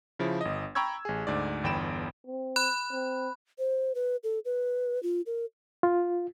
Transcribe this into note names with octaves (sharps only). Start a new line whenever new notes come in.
C#3 F3 E4
G1 D#5
G5 A#5 B5 C#6 E6 G#6
A1 G#4
D2 G#2 D5
G1 E2 G5 B5 D7 E7
C4
B5 F#6
C4
C5
B4
A4
B4
F4
A#4
F4